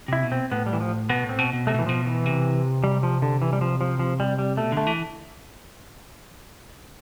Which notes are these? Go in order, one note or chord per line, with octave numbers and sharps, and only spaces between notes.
C3 E4
B2
C4
A2 B3
G3
E3
F3
B2 B3
A2
C4
B2
B2
C3 A3
B2
E3
A2
B2 F3
E3
C3
G3
F3
D3
E3
G3
F3
F3
F3
G3
G3
B2 A3
D3 A3
E3